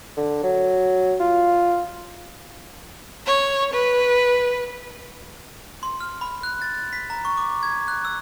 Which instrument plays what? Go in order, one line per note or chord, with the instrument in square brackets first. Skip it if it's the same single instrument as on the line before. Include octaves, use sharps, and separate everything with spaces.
[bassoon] D3
F#3
F4
[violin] C#5
B4
[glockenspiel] C6
F6
B5
F#6
A6
B6
A#5
C#6
D6
G#6
F#6
E6